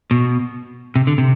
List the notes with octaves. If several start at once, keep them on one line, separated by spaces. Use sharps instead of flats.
B2
C3
D3
C3